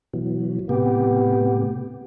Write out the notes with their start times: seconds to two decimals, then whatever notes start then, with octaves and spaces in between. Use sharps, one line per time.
0.13 B2 E3 F#3
0.69 A2 C3 B3 G4